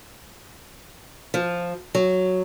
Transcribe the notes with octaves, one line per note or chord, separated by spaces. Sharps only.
F3
F#3